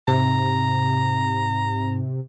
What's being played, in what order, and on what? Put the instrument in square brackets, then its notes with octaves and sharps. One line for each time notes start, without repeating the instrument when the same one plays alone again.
[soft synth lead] G#2 [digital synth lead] C3 [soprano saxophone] A#5